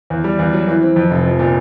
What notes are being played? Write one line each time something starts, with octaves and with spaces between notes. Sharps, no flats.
E2
G3
E2
F#3
E3
C4
F2
F1
F3
A#2